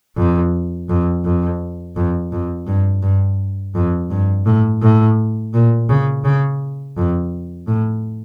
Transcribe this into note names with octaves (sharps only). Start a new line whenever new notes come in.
F2
F2
F2
F2
F2
G2
G2
F2
G2
A2
A2
A#2
C#3
C#3
F2
A2